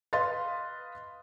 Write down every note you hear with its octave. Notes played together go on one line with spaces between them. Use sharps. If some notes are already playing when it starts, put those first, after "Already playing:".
B4 D#5 F5 C6 A6